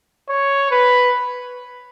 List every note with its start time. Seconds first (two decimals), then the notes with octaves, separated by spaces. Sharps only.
0.29 C#5
0.71 B4